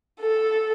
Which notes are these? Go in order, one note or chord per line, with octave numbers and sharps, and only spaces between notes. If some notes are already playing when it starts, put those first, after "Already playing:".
A4